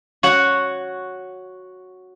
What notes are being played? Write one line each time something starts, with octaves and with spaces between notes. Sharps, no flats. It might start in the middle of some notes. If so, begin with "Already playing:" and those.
F#4 C#5 F#5